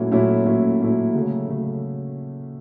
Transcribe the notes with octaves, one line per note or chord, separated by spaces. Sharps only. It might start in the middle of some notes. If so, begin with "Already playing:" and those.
Already playing: A#2 F#3 A3 C#4 E4
A#2 F#3 A3 C#4 E4
A#2 F#3 A3 C#4 E4
A#2 F#3 A3 C#4 E4
C#3 F#3 A3
C#3 F#3 A3